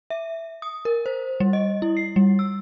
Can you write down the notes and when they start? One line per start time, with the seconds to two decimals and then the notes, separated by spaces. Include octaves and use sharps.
0.10 E5
0.62 D#6
0.85 A#4
1.06 C5
1.40 G3
1.53 D#5
1.82 E4
1.97 C7
2.16 G3
2.39 E6